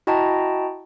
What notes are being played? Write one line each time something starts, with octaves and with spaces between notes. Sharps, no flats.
E4 F#4 D#5 G5 A5 A#5